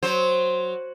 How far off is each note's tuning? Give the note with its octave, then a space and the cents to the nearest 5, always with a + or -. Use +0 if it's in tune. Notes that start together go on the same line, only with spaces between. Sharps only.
F#3 +0 C5 +0